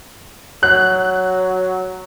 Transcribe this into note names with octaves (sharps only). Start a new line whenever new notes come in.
F#3 F#6